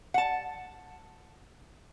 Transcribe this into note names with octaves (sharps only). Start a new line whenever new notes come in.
F#5 A5